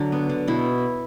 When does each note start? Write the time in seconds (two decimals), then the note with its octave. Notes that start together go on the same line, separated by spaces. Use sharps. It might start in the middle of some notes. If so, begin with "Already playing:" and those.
Already playing: D3 F#3 D4 F#4
0.12 B3
0.29 D3
0.48 B2 E4